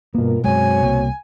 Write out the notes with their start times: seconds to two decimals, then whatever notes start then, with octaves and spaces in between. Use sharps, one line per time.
0.15 G2 B2 A#3 B3 F4 A#4
0.44 F#2 G#3 C4 F#4 C#5 G#5
0.83 C2 A#3